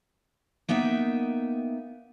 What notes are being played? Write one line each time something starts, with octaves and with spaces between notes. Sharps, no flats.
A#3 B3 D#4 E5 G5